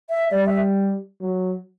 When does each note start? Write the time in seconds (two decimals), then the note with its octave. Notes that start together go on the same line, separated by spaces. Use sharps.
0.10 E5
0.31 G3 D5
0.46 E5
1.21 F#3